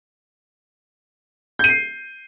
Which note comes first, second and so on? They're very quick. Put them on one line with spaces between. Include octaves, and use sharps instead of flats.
G6 D#7 C7